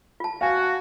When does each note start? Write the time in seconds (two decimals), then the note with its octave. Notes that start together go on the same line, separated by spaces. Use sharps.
0.20 F4 A5
0.41 F#4 F5 G#5